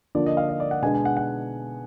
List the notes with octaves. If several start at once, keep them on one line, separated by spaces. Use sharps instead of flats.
D3 F3 A#3 D4 D5
D#5
F5
D#5
D5
F#5
B2 G#3 B3 D4 G#5
G#5
F#5
F#5